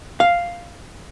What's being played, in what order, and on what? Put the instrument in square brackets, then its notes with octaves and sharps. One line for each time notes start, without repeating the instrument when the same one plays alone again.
[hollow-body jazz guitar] F5